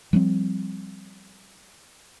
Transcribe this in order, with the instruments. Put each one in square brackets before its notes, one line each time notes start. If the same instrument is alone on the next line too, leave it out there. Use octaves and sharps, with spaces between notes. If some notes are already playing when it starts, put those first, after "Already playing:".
[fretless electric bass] F3 G3 B3 C4